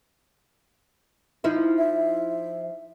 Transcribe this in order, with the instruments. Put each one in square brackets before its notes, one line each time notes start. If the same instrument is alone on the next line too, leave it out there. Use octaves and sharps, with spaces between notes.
[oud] F3 D#4 E4
[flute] E5